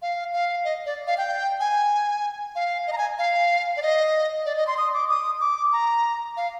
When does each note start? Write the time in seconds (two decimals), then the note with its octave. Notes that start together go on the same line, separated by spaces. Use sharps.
0.02 F5
0.33 F5
0.64 D#5
0.86 D5
1.07 F5
1.18 G5
1.60 G#5
2.55 F5
2.87 D#5
2.93 A#5
2.98 G#5
3.18 F5
3.77 D5
3.82 D#5
4.46 D5
4.57 D#5
4.67 C6
4.78 D#6
4.94 D6
5.09 D#6
5.41 D6
5.73 A#5
6.37 F5